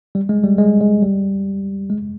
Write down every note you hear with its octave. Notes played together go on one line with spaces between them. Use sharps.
G3
G#3
G3
G#3
G#3
G3
G#3